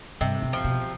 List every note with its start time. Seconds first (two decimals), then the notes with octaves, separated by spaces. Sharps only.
0.21 G2 C3
0.42 B2
0.53 F3
0.64 B2